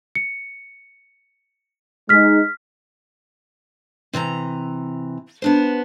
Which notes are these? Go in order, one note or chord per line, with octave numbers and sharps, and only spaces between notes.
C#7
G#3 D#4 F6 B6
C3 E3 D5 A#5
B3 D4 C5